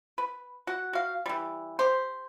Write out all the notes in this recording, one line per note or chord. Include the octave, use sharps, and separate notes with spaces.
B4
F#4 F#5
F#4 F5
E3 G3
G4 C5